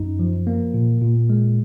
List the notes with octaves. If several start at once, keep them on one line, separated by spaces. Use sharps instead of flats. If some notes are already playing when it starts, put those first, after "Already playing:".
Already playing: F#2 D#4
F3
A#3
A#2
A#2
G#3